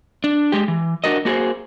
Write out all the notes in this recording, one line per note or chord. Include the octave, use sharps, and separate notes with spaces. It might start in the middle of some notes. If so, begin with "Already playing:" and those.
D4
G#3 G4
E3
D4 F#4 A#4 D#5
A#3 F#4 G#4 A#4 C5